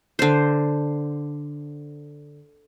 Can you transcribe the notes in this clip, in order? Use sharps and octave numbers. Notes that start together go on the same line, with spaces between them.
D3 C5